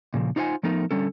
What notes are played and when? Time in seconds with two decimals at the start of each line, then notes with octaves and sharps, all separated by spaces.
0.14 A#2 C#3 F3
0.36 D#4 F4 C5 E5 F#5 G#5
0.63 F3 A3 B3 D#4 A#4
0.91 D3 G3 C#4 A4